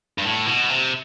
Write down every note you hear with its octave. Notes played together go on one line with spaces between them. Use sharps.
G2
A2
B2
C3